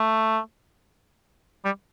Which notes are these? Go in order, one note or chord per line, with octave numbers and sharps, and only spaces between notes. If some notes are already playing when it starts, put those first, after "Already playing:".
Already playing: A3
G3